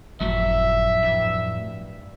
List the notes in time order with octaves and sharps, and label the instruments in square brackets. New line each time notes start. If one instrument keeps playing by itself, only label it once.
[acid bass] G1 [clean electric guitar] F2 A2 F#3 [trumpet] E5
[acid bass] G2